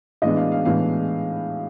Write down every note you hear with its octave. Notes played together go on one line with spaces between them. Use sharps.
A2 E3 G#3 B3 D4 D#5
F5
F5
A2 E3 G#3 B3 D4 F5